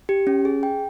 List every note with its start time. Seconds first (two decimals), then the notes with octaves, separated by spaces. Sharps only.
0.09 G4
0.27 C#4
0.45 G#4
0.63 G5